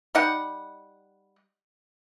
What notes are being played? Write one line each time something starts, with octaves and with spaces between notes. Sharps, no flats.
G3 D#4 F#5